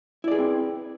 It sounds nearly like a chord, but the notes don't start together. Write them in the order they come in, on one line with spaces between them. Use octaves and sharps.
E4 D5 G#4 B4 C4